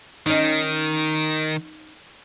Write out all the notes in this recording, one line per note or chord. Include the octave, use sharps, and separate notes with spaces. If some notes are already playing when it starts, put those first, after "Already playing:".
D#3 C#4 D#4